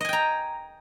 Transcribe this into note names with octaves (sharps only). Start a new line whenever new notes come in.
D#5 G5 G#5 A#5